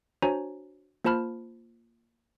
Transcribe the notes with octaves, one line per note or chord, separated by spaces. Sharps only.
D4 F#4 C5 C#5 G#5 A#5
A#3 F4 C5 A5 B5 F6